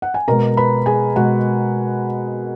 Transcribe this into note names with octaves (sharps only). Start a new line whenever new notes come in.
F#5
G#5
B2 G#3 A#4 A#5
B4 B5
G#4 G#5
B2 G#3 F#4 F#5